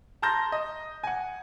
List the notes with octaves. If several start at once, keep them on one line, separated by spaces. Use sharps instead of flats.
A5 A#5 C6 G6 A#6
D#5
F#5 G#5